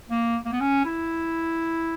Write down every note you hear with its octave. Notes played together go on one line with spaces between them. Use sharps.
A#3
A#3
B3
C#4
E4